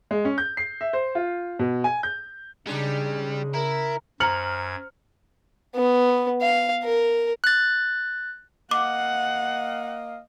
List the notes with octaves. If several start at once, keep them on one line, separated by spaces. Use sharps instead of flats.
G#3
C#4
G6
C7
E5
C5
F4
B2
G#5
G6
C#3 G3 G#3 D4 D#4
E4 A#4
F#2 C5 A#5 F6 G#6 C#7 F#7
B3
F5
A#4
F#6 A6
A#3 D#5 F5 F#5 D6